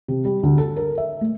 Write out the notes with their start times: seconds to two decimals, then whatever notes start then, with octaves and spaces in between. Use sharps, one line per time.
0.08 C3
0.25 G3
0.43 D2
0.58 A4
0.76 A#4
0.98 E5
1.21 A3